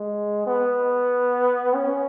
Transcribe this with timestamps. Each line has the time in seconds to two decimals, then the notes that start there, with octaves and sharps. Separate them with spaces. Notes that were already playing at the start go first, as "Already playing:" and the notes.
Already playing: G#3
0.47 B3
1.75 C#4